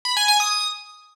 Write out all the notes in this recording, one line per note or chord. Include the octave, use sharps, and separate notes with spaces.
B5
G#5
G#5
D#6